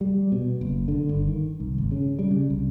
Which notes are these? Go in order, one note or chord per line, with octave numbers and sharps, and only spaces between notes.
G3
B2
F#1
D3
G1
D#3
C2
G#1
C#3
G3
C#3
C2